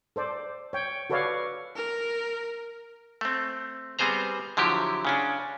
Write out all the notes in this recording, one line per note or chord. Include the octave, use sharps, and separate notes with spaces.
A4 C5 D5
C#5 G5
F#4 A4 B4 C#5 D5 F5
A#4
A3 C4
G3 B3 C4 G#4 C5 A#5
D3 F3 F#3 E4 G4
C#3 C#4 D4